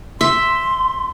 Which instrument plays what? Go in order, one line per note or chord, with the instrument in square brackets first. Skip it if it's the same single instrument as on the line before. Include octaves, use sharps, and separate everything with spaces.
[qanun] E5 [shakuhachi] C6